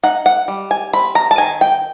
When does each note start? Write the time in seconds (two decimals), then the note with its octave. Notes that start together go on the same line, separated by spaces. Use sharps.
0.03 D#4 F#5
0.26 F#5
0.48 G3
0.71 G#5
0.93 C4 B5
1.15 A#5
1.31 A5
1.38 D#3 G#5
1.61 G5